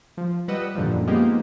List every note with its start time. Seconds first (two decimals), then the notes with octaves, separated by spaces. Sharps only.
0.17 F3
0.48 F3 G3 B4 D#5 F#5 E6
0.75 F#2 A#2 D3 D#3 F3 G3
1.07 F3 G#3 A#3 B3 D#4 G4